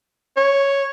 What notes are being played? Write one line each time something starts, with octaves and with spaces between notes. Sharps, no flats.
C#5